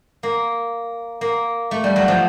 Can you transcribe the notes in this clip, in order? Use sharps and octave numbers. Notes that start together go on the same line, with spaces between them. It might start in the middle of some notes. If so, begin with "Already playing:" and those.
A#3
A#3
A3
G3
F#3
F3